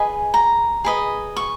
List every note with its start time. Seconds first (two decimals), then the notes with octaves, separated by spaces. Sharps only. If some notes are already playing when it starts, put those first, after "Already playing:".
Already playing: G#4 B4 D#5 G#5
0.34 A#5
0.85 G#4 B4 D#5
1.37 C#6